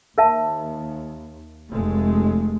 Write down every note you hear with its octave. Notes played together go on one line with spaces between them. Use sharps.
D#2 A#4 E5 A5
F1 G#3 A3